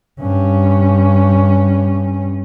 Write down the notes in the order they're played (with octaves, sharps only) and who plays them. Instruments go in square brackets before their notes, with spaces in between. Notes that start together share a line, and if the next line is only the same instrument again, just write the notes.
[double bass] G2 C#4